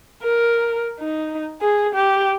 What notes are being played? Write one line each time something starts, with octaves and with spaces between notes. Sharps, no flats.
A#4
D#4
G#4
G4